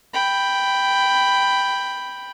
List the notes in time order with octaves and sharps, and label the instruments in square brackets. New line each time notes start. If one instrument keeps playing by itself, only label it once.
[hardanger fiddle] G5 B5